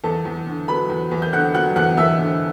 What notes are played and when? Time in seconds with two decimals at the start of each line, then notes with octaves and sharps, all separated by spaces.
0.04 E2 A4 A5
0.25 E2
0.47 D3
0.68 F#3 B4 B5
0.90 E2
1.11 E2
1.22 G6
1.33 D3 F#5 F#6
1.54 F#3 F#5 F#6
1.76 E2 F#5 F#6
1.97 E2 E5 E6
2.19 D3